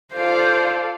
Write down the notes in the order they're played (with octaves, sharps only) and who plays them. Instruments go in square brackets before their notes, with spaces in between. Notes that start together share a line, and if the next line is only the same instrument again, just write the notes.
[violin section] F4 A4 D5 F5 [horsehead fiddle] C5